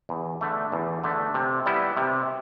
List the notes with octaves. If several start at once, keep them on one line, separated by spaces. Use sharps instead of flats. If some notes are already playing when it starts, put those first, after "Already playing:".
E2
D3 A3
E2
D3 A3
C3
G3 B3 E4
C3